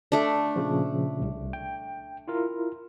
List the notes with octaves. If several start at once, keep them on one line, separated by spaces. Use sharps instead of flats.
A3 D4
A#2 C#3 F3
C2
G5
E4 F4 A#4